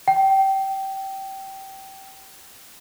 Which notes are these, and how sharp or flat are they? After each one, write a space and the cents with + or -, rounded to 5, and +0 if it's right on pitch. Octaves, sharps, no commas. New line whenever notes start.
G5 -20